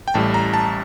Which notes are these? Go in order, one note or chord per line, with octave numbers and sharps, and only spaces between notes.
G5
A1 A2 G3 A5
A#5
A5